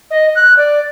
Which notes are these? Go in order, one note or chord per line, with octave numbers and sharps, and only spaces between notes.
D#5
F#6
D5